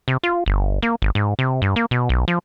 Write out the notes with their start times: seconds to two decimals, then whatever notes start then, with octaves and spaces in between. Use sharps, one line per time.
0.08 C3
0.23 F4
0.46 G1
0.82 A#3
1.02 G#1
1.15 G#2
1.39 C3
1.62 G2
1.76 A#3
1.91 B2
2.09 B1
2.28 F3